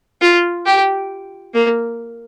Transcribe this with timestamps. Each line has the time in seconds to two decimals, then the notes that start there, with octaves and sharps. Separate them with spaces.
0.21 F4
0.66 G4
1.54 A#3